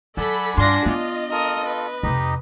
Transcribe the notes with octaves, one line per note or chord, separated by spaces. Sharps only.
F#3 A4 D5 F#5 G#5 B5
G2 D4 F4 C6 A#6
B3 D4 F4 D#5
F4 A4 A#4 D#6
B4
F2 C3 D#4 G4 D#5